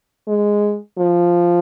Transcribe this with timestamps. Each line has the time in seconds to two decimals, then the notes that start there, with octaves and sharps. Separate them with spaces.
0.28 G#3
0.98 F3